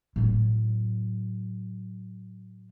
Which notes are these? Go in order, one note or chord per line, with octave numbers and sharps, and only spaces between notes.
A2 F#3